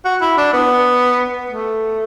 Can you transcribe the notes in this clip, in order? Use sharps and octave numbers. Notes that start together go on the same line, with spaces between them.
F#4
E4
D4
B3
A3